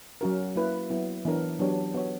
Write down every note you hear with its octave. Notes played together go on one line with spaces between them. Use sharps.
F#3 C#4 F#4 A#4
A#3 E4 B4
F#3 B3 E4 B4
E3 B3 D4 A#4 C#5
F#3 B3 D4 G4 C#5
B3 F#4 C#5